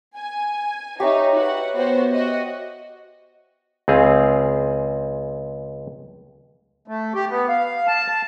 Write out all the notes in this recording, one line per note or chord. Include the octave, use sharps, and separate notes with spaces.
G#5
D#4 G4 C#5 E5
F#4 B4 F#5
B3 F#4 C5
F#4 D#5
C#2 C4 G#4 F5
A3
G4
B3
F5
A5
A5